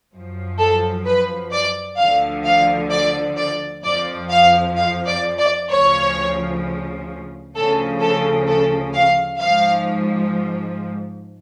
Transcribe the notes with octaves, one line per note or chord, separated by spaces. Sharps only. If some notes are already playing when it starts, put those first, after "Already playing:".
F#2 F3
A4
B4
D5
D2 D3 F3 F5
F5
D5
D5
F2 F3 D5
F5
F5
D5
D5
D2 C#3 F3 C#5
D2 C#3 F3 A4
A4
A4
F5
F3 F5
G#2